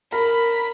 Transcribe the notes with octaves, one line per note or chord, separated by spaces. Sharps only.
A#4 B5